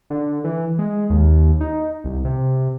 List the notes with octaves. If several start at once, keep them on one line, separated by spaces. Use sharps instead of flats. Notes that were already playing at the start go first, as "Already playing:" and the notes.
D3
E3
G#3
D#2
D#4
C2
C3